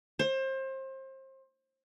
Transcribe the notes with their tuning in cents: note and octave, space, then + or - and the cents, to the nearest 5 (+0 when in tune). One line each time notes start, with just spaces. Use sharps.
C5 +30